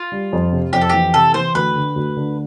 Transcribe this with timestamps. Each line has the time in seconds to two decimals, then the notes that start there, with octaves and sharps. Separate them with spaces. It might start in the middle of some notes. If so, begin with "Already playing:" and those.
Already playing: F4
0.12 G3
0.33 F2
0.52 C3
0.73 F2 G4
0.81 A4
0.89 E3 G4
1.14 C3 A4
1.34 E3 C5
1.55 D2 B4
1.75 D3
1.96 D2
2.17 D3